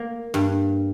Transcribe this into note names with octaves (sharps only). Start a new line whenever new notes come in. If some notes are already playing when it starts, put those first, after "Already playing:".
Already playing: A#3
G2